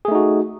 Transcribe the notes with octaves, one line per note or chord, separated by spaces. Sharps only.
A3 D#4 F#4 G#4